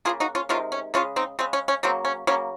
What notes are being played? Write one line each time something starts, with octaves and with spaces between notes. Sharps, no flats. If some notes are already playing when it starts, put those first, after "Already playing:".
C#3 F#3 A#3 F4 G#4
D#4 F#4
C#4 F4
C3 D#3 G#3 C#4 F4
C#4
C#3 G#3 C#4 F4
C4 D#4
C#3 G#3 C4
C#4
C#4
C#3 F#3 A#3 C4
C#4
C#3 F#3 A#3 C#4